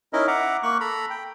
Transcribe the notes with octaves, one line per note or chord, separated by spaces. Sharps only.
C#4 D#4 E4 A#4 D#5
E5 F#5 A#5 D6
A#3 C#6 F#6
A4 A#5 B5
G5